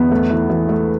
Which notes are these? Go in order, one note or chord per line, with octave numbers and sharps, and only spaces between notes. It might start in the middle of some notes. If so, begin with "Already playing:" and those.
Already playing: E2 B3
A3
E3
E3
A3